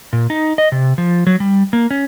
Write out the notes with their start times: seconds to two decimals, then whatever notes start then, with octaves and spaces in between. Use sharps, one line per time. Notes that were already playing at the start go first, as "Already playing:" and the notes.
0.13 A#2
0.30 D#4
0.58 D#5
0.72 C3
0.98 F3
1.27 F#3
1.40 G3
1.73 A#3
1.91 C#4